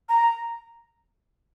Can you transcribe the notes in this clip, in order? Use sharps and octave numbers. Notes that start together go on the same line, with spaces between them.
A#5